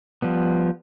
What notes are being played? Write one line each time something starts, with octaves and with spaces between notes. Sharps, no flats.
F3 G3 B3